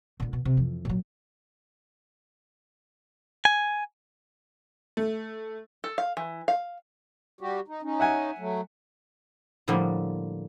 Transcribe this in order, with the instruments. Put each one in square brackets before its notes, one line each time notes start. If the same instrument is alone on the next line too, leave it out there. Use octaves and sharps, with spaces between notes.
[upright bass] A#2 D3
B2
C3
F2 E3
A#2 F#3
[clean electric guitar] G#5
[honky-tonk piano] A3
[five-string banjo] A4
F5
E3
F5
[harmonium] G3 F#4 G4
D#4
C#4 D#4
[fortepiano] E5 F#5 G#5
[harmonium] F#3 A3
[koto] A2 D3 F3 G3 A#3